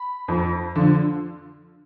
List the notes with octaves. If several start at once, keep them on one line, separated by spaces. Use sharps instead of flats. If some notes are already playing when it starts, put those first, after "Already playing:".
Already playing: B5
F2
D3 F3